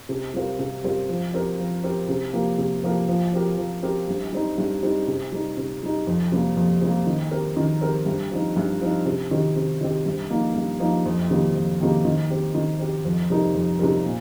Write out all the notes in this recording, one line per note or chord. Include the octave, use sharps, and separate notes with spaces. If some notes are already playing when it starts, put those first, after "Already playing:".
C3
G3 C4 F4 A#4
C3
G3 C4 F4 A#4
F3
C4 G4 A#4
F3
C4 G4 A#4
C3
F3 A#3 G4 A#4
C3
F3 A#3 G4 A#4
F3
C4 G4 A#4
F3
C4 G4 A#4
G2
G3 C4 D#4
G2
G3 C4 D#4
C3
G3 D#4
C3
G3 D#4
F2
C3 G3 A#3
F2
C3 G3 A#3
D#3
C4 G4 A#4
D#3
C4 G4 A#4
G2
F3 C4 D#4
G2
F3 C4 D#4
C3
D#3 C4 G4
C3
D#3 C4 G4
G2
F3 A#3 D#4
G2
F3 A#3 D#4
F2
C3 D#3 A#3 G4
F2
C3 D#3 A#3 G4
D#3
C4 G4
D#3
C4 G4
F2
C3 G3 D#4 A#4
F2
C3 G3 D#4 A#4
A#2